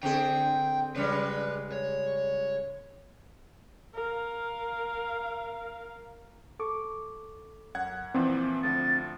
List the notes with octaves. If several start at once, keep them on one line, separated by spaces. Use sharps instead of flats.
D3 C4 G#4 G5
C#3 G3 G#3 B4
C#5
A#4 F5
A4 C#6 D6
F#2 F#5 G#6
A#2 E3 F3 C4
D2 F3 A6